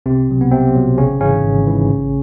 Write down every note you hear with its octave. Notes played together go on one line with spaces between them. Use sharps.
C2 C3 C4
B2 F#3
B3
C2 C3 C4
B2 F#3
G#1 C#3 C#4
G#2 C#3 E3 C#4
G#1
G#2 E3
A1